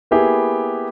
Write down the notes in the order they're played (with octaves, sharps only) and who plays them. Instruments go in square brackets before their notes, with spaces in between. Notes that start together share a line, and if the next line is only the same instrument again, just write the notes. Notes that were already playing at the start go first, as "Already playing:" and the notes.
[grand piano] A#3 B3 E4 G4 G#4